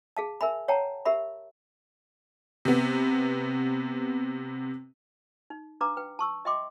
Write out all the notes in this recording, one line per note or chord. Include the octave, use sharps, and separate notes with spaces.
G#4 F5 A5
A#4 E5 G#5 B5
C#5 F#5 G5 A5 A#5
G4 A#4 E5 B5
C3 B3
D#4
D4 B4 F5 A#5 D6
B4 G5
A5 C#6 E6
D#5 E5 G5 C6 D6